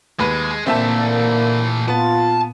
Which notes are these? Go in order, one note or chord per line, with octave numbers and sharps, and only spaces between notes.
D#2 G#3 B4
A#2 D3 E3 A3 A#3 C4 E5 A5
B3 F4 A5